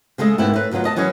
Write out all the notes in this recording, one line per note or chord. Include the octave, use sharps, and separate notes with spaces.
C#3 G#3 A3 G#4 D#5
G#2 B2 A#3 C4 E4
A2 B4
D2 B2 F#3 F4 D#5
B2 D#5 A5
E3 F#3 C#4 C#5 D#5